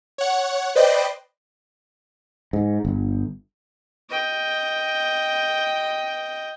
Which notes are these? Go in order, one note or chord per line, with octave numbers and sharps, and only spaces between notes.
C#5 F#5
B4 C5 D5 D#5 G5
G#2
G1
D#5 G5